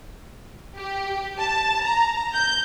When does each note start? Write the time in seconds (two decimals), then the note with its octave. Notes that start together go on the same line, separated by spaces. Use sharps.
0.75 G4
1.39 A5
1.85 A#5
2.33 G6